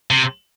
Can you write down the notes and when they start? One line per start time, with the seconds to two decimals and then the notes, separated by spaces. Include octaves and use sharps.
0.10 C3